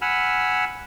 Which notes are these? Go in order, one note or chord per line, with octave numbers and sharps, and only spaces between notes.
F#5 G#5 B5 E6 F6